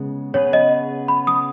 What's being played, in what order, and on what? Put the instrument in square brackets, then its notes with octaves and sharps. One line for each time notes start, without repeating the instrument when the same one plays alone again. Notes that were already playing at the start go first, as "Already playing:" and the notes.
Already playing: [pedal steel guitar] C#3 G#3 B3
[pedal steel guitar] C#3 B3 G#4 B4 [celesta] C#5
[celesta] D#5
B5
D#6